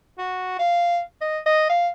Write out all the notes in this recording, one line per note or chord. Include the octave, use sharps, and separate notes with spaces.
F#4
F5
D#5
D#5
F5